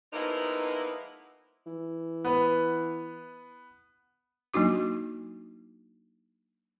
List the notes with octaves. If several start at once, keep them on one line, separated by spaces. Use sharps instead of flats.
F3 G#3 A#3 B3 D#4 E4
E3
B3 B4
F#3 A#3 D4 D#4 F#4 D6